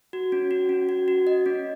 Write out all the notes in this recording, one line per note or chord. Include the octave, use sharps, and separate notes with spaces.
F#4
C#4
F#4
C#4
F#4
F#4
D#5
C#4